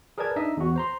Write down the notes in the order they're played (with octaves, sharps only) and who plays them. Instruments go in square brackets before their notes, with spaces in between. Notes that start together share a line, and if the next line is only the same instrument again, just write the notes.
[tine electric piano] G#4 A#4 B4 D5 A5 G#6
D4 D#4 D#5 E5
E2 F#4
C5 A#5 C6